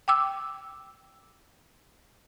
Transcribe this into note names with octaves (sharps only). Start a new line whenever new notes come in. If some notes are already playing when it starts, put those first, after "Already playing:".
G5 D6 E6